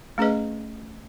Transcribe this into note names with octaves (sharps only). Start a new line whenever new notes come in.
A3 C#4 G#4 B4 D#5